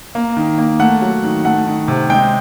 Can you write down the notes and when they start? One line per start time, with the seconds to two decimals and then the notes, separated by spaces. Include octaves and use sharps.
0.15 A#3
0.37 D#3
0.58 A#3
0.80 A3 F#5
1.02 F#3
1.24 D#3
1.45 A3 F#5
1.66 D#3
1.88 C3
2.10 G#3 G5